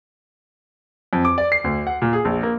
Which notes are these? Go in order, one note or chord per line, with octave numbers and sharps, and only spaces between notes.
F2
D6
D5
C7
D2
F#5
A#2
G#4
A#1
A#3